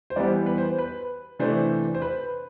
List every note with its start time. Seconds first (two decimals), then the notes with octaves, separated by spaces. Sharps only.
0.10 C5
0.16 E3 G3 B3 D5
0.46 B4
0.58 C5
0.79 B4
1.39 C3 E3 A3 D4 C5
1.95 C5
2.02 B4